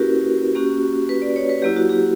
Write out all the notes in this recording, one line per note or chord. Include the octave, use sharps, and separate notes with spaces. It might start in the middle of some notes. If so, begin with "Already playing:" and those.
Already playing: A#3 C#4 E4 F#4 G4 A#4 B4
A#3 C#4 F#4 G4
B4
D5
C#5
B4
F#3 A#3 E4 G4
F#4
G4